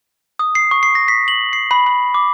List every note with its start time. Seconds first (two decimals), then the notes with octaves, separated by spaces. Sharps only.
0.39 D#6
0.55 C7
0.71 C#6
0.83 C7
0.95 A#6
1.08 B6
1.28 F#7
1.53 C7
1.71 B5
1.86 B5
2.14 D6